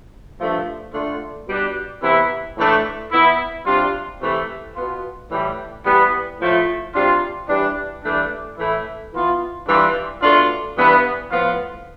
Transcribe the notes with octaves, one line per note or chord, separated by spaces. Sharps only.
G2 F3 A3 D4
D3 A3 D4 F4
B2 G3 D4
C3 E3 B3 E4
A2 E3 A3 D4
E3 B3 E4
C3 G3 D4 F4
C3 E3 A3
B2 B3 F4
A2 E3 G3
E3 G3 B3
A2 F3 A3
C3 G3 D4 F4
E3 G3 D4
G2 E3 A3 D4
A2 E3 A3 E4
E3 B3 F4
G2 E3 G3 D4 F4
B2 A3 D4 F4
G2 E3 B3
A2 F3 B3 F4